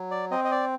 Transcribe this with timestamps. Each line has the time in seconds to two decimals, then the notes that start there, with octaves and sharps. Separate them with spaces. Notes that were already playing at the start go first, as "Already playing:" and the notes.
Already playing: F#3
0.11 D5
0.31 C4 D#5
0.45 D#5
0.51 D5